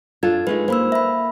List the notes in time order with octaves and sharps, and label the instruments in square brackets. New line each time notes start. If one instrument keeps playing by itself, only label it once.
[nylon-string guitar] D4 F4 A4 [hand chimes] G#6
[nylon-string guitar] G#3 A3 D#4 [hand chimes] B4
[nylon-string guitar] A#3 [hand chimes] C5 B5 E6
[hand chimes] E5 B5